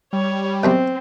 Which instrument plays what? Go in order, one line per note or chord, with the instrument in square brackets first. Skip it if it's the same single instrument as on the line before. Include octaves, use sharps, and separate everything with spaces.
[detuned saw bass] G3 [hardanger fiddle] C#5
[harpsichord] B1 F#2 C3 [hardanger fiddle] C4